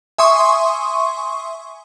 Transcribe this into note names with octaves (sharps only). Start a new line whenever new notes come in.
E5 G#5 C6 C#6 D#6